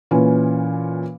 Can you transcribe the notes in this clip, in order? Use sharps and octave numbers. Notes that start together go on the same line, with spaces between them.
A#2 E3 C#4